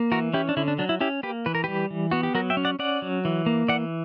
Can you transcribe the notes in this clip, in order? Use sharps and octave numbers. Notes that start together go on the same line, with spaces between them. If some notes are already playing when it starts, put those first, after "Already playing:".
Already playing: A#3
E3 F#4 A#4
C#4 E4 G4
D4
D3 E4
D4
F#3 D4
E4
C#4 E4 G4
A#3 G4 B4
E3 B4
A#4
G3 G4 B4
E3
B3 F#4
G4
F#3 F#4 A#4
E5 G5
C#4
D5 F#5
C#4 D5 F#5
F#3
E3
A#3
E3 D5 F#5